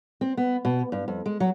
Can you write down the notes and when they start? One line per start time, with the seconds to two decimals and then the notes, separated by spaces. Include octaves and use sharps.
0.21 C4
0.37 B3
0.65 B2
0.92 G2
1.08 F2
1.26 G#3
1.40 F#3